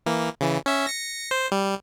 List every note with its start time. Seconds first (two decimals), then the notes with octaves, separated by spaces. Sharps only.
0.06 E3 A#3
0.41 C#3 E3
0.66 C#4 E5
0.87 A#6 C#7
1.31 C5
1.52 G3